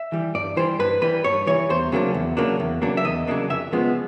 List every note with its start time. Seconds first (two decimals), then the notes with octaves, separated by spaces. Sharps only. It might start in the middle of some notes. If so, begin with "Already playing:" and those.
Already playing: E5
0.12 E3 G3
0.35 G2 D5
0.57 E3 G3 C5
0.79 G2 B4
1.01 E3 G3 B4
1.24 G2 C#5
1.47 E3 G3 C#5
1.70 E2 C5
1.92 C#3 F#3 A#3 D4
2.14 E2
2.37 C#3 F#3 A#3 D4
2.60 E2
2.82 C#3 F#3 A#3 D4
2.97 E5
3.05 E2 D#5
3.27 C#3 F#3 A#3 D4
3.50 F2 E5
3.72 C#3 F3 G#3 B3